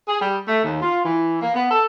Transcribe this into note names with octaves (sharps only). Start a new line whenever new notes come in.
G#4
G3
A3
D#2
F4
E3
A#3
B3
A4